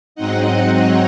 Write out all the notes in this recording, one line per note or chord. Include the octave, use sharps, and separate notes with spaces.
G#2 F#3 C4 D#4 D#5 F#5
C#5